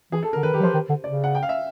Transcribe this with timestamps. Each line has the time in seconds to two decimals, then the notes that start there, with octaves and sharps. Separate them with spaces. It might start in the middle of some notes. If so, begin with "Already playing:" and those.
0.12 E3 G#4
0.23 A4
0.33 A#4
0.36 D3
0.43 D#3 B4
0.54 D#3 G4
0.60 F#3
0.63 F3 C5
0.74 D#3
0.89 D3
1.04 C#3 D5
1.24 F#5
1.35 G5
1.43 F5
1.49 E5